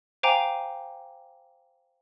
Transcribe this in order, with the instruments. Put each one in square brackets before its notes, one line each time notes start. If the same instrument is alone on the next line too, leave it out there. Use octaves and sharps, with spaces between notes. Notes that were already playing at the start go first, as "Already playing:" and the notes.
[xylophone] C5 F5 G5 G#5 A#5 D6